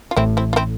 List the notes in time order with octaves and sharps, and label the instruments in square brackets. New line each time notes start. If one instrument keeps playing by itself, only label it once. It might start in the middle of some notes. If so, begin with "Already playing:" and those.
[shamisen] F4
[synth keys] A1 A2 [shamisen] C4 E4
[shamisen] C4 E4
F4
C4 E4